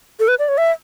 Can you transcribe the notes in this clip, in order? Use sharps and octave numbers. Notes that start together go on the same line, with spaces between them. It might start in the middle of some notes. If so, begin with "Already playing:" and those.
A4
B4
D5
C#5
E5